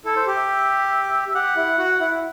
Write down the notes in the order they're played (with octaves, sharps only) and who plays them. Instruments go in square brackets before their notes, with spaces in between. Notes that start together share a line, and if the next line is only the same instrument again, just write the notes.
[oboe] E4 [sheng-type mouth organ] A4
[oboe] C5
[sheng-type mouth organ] G4
[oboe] E5
[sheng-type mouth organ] G4 [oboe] F#5
[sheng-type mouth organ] E4
F#4
E4